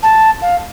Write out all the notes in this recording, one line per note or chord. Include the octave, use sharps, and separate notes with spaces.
A5
F5